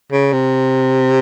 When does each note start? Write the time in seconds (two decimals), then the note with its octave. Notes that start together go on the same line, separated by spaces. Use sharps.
0.12 C#3
0.33 C3